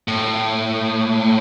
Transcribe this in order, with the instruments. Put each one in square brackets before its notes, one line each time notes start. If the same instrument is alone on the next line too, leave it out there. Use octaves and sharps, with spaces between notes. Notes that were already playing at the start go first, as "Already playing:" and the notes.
[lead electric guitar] A2